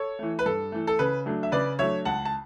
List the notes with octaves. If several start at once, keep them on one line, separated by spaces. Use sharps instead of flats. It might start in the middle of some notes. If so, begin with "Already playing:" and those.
Already playing: A4 C#5
E3 A3
B4
G2 A4
E3 A3
A4
C#3 B4
F#3 A3 D4
E5
C#3 B4 D5
F#3 A3 D4 C#5 E5
C#2 F#5 A5
A5